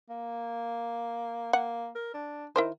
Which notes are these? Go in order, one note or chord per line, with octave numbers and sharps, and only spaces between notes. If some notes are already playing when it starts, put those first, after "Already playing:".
A#3
A#3 F#5
A#4
D4
D#3 E4 A#4 C5